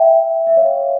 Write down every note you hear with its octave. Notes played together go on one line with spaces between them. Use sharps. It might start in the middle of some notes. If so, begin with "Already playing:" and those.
Already playing: E5 G5
E5
C#5 F5